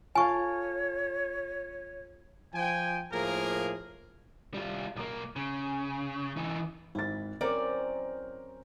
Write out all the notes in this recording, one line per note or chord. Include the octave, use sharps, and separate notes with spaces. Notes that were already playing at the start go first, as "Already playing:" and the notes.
F4 A4 C#5 F5 G#5 C#6
F3 G5 G#5
A2 F3 A#3 G#4 A#4
G3 F4
B1 A#3
C#3
E3 D#4
G#1 E4 A6
F#3 C4 C#4 A#4 D5